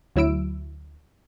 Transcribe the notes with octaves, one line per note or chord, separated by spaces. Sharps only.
D2 F#3 E4 E6 D7